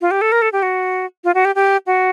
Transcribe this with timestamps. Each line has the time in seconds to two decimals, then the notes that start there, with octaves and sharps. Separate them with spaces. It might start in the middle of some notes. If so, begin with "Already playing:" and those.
0.01 F4
0.11 G4
0.21 A4
0.32 A#4
0.42 A4
0.53 G4
0.63 F#4
1.24 F4
1.35 F#4
1.45 G4
1.55 G4
1.87 F#4